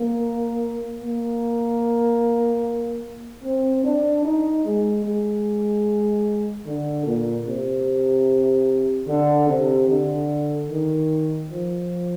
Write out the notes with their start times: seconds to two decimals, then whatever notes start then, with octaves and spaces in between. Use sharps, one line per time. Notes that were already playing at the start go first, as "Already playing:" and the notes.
Already playing: A#3
1.02 A#3
3.43 C4
3.84 D4
4.25 D#4
4.65 G#3
5.04 G#3
6.66 D3
7.06 A#2
7.47 C3
9.07 D3
9.49 C3
9.88 D3
10.69 D#3
11.50 F3